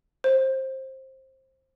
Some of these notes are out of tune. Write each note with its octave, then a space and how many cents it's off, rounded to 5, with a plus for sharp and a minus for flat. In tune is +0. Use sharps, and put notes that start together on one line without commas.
C5 +20